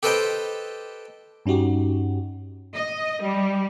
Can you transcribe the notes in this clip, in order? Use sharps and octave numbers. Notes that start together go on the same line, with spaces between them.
G4 A4 B4 C5 D#5 G5
G2 C#4 D#4 F#4 G4
D#5
G3